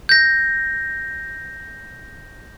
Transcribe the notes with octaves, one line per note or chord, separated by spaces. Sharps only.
G6 A#6